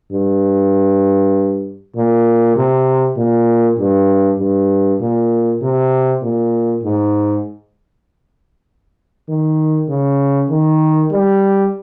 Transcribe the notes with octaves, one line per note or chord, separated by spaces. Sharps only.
G2
A#2
C3
A#2
G2
G2
A#2
C3
A#2
G#2
D#3
C#3
D#3
G3